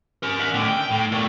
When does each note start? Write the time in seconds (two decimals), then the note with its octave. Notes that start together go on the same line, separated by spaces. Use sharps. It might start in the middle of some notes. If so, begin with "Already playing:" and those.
0.23 C#4 A#4
0.39 E5 F#5
0.54 A2 D3
0.68 G5
0.91 A2
1.12 A#2 A3